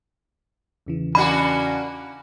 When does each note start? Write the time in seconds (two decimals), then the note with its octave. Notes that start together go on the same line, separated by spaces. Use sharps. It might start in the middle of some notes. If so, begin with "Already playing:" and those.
0.86 E2 C#3 E3
1.15 A#3 C#4 D4 F#4 B5